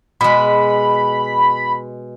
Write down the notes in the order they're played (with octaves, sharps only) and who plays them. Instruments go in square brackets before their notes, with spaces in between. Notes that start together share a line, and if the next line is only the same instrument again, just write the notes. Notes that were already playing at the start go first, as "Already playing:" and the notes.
[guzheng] B2 G#3 [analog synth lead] B5